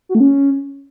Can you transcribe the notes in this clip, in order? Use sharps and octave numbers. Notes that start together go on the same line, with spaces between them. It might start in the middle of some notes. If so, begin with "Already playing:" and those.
F#4
A3
C#4